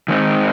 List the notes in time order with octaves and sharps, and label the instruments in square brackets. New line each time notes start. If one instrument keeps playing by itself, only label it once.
[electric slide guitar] D#3 G#3 C4 D#4